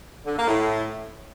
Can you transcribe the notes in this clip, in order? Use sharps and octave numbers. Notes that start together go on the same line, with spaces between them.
D3
A#3
A2